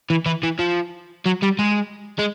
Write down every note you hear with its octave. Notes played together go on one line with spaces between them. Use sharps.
E3
E3
E3
F3
F#3
G3
G#3
G#3